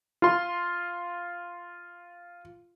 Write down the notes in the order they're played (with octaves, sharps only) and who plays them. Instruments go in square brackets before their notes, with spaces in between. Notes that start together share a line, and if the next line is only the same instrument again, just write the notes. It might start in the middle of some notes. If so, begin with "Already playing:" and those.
[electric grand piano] F4 C6